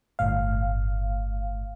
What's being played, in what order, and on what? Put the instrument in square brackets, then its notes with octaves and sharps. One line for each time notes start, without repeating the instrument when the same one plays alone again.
[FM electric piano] G1 A2 F5